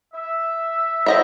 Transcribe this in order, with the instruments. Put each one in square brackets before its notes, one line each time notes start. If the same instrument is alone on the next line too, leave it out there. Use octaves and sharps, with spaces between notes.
[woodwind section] E5
[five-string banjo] F3 D#5 E5 [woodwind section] G4 [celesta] A4 C#5 F#5